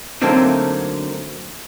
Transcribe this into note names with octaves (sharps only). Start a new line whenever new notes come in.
D3 F#3 A3 A#3 C4 D#4